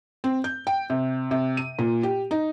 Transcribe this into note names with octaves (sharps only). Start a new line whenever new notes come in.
C4
G6
G5
C3
C3
D#7
A#2
G4
D#4